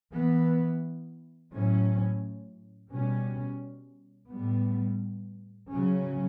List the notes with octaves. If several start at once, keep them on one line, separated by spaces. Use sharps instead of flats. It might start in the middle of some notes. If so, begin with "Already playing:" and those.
E3 B3
A2 F#3 C#4
B2 G3 C#4
A2 G3 B3
C#3 F#3 C#4